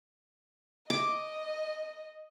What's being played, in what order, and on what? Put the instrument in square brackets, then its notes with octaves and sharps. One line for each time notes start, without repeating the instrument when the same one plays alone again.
[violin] D#5 [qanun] D6